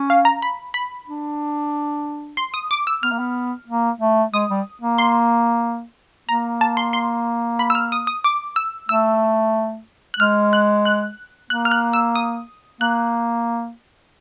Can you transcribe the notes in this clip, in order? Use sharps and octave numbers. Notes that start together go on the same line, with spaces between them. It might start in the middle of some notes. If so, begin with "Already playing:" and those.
Already playing: C#4
F5
A#5
B5
B5
D4
C6
D#6
D6
E6
B3 F6
A#3
B3
A#3
A3
G#3 D#6
G3
A#3
C6
A#3 A#5
A5
C6
C6
B5
E6
F6
D#6
D#6
D6
E6
A3 E6
F#6
G#3 F6
F#6
F#6
A#3 F#6
F6
F#6
E6
D#6
A#3 F#6